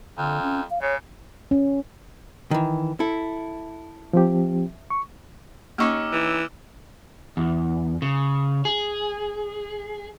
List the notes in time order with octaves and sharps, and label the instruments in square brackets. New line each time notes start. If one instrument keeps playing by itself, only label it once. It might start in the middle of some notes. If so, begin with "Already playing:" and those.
[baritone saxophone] F2 [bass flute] D3
[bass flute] C#4
F5
[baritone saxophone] C#3 [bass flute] C#5
[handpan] C#4
[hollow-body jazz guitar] D#3 E3
E4 A4
[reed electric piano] F3 C4 G4
C#6
[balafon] A#3 C#6 [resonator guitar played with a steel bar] C#4 D#4 G4 [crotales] D6 E6 F6
[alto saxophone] E3
[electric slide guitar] E2
C#3
G#4